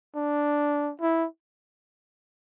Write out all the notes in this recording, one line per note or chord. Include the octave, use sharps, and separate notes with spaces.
D4
E4